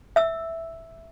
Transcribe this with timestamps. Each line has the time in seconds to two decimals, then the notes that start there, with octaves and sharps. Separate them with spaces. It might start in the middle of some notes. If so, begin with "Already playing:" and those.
0.16 E5 E6